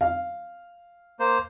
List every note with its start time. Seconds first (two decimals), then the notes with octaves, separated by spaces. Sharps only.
0.01 F5
1.20 A#3 C5